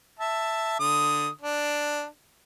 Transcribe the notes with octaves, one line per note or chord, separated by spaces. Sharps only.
E5 A5
D3 D#6
D4